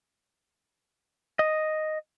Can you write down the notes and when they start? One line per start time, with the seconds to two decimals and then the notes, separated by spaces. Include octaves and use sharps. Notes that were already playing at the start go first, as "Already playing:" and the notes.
1.39 D#5